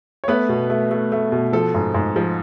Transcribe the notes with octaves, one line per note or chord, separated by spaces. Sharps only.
C#5
A3 B3 B4
B2
A3
A3
A3
B2
F3 A4
G#2
G#2
F3